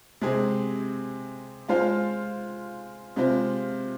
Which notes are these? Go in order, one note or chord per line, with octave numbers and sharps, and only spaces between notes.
C3 G#3 C4 G#4
G#3 F4 C5 F5
C3 G#3 F4 C5